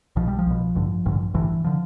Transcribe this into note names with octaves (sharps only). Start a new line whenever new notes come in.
B1 B2 F3
G3
F3
B1 B2
A1 G2 D3
A1 G2 D3
A1 G2 D3 E3
D3 F3